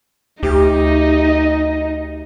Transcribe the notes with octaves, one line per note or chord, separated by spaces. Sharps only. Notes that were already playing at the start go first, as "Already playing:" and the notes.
D2 D#4 G4 D#5